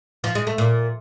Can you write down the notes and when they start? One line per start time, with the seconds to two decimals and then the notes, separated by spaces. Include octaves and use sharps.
0.24 F3
0.35 G#3
0.47 A3
0.58 A#2